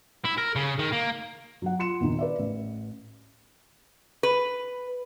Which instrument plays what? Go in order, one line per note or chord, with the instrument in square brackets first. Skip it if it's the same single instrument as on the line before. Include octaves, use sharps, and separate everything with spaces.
[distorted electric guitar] E4
A#4
C#3
D#3
A#3
[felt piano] F#3 F#5
F4 C6 C#7 E7
E2 A#2 D#3 D#4
B4 D5 E5
A1
[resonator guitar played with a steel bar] B4